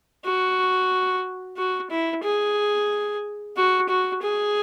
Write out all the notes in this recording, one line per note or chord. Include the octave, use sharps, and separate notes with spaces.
F#4
F#4
E4
G#4
F#4
F#4
G#4